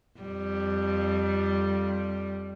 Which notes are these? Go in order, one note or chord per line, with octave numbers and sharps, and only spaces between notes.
F2 G3